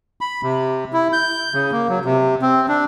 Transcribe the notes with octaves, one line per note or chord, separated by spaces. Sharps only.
B5
C3
E4
G6
C#3
A#3
F#3
C3
C4
D4